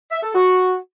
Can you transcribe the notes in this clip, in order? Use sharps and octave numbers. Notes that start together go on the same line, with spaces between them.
E5
A4
F#4